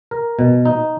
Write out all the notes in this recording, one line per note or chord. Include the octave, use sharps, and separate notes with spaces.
A#4
B2
D#4